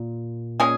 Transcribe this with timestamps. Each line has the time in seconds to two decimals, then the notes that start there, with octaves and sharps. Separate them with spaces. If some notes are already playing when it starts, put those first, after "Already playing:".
Already playing: A#2
0.60 A#2 G#3 C#4 G#4